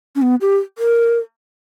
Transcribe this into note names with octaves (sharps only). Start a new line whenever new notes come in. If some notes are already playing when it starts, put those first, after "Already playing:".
C#4
B3
G4
A#4